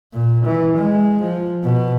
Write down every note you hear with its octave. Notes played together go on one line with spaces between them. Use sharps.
A#2
E3
G#3
F3
B2